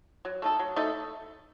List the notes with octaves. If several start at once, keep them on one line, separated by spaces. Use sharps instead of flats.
F#3
A3 D#4 A4
F#3
A3 D#4 A4